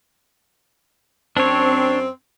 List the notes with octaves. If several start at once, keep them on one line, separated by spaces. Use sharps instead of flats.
F#2 C4 D4 C#5